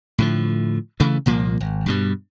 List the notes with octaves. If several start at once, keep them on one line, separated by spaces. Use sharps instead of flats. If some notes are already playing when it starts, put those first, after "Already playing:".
A2 D3 F3
C#3 E3 A3
C2 A#2 F3 A#3
G#1
G2 B2 G3